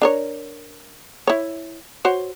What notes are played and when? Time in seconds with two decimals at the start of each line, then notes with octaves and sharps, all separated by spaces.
0.02 D4 A#4 C#5
1.27 E4 C#5
2.05 F#4 C5 C#5